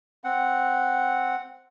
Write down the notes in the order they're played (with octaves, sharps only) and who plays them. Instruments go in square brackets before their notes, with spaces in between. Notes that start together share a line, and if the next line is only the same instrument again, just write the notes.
[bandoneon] C4 F#5